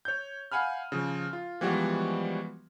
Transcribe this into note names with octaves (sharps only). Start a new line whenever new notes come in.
C#5 G6
F5 F#5 G#5 B5 F6
C#3 F3
F4
E3 F3 G3 G#3 B3 F#4